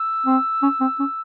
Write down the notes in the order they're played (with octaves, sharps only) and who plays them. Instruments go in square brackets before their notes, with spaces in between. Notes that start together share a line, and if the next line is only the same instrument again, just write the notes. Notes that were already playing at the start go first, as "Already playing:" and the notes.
Already playing: [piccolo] E6
[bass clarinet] C4
C#4
C4
C#4